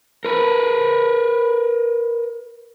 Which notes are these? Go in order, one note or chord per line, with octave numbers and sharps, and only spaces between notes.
A#4 B4